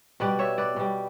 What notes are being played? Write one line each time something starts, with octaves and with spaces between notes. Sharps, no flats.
B2 G3 B4 D5
C#5 E5
B4 D5
B2 G3